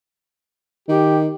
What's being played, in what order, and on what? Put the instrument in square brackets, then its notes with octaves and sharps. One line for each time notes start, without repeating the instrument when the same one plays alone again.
[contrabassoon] D#3 [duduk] G4